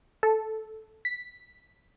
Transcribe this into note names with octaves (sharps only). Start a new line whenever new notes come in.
A4
B6